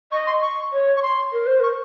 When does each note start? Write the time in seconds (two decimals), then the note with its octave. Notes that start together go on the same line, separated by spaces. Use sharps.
0.12 D#5 C#6
0.27 C6
0.42 C#6
0.73 C#5
0.97 C#6
1.03 C6
1.32 A#4
1.46 C5
1.59 A#4 C#6